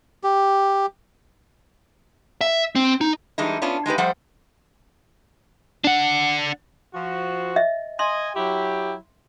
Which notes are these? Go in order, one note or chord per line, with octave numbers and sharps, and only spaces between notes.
G4
E5
C4
D#4
E3 G3 G#3 D4 D#4
B3 C#4 D4 F4
G#3 D#4 G4 B4
F3 G3 A3 C5 F#5
D4 F#5
F3 F#4
D#5 E5
D#5 G#5 C6
F#3 E4 G4